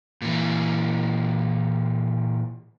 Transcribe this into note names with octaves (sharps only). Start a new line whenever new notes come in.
A#2 E3